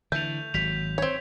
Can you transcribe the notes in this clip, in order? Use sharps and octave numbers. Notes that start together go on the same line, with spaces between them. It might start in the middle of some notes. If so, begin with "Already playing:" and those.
D3 E3 A3 G6 F7
G#1 F#3 B6 F7
C4 C#5 G#6